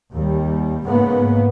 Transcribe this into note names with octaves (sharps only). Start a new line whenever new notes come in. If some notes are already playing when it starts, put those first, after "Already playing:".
D#2 G3
G#2 C#3 A#3 B3